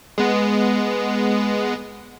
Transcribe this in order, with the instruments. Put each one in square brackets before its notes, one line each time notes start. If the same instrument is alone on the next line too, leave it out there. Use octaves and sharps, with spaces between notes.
[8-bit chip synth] G#3 B3